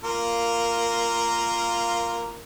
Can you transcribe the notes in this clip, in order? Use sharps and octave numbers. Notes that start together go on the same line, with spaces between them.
A#3 F4 A#4